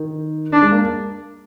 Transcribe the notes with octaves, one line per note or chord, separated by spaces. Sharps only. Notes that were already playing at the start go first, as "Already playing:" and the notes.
Already playing: D#3
D4
G#3
A#3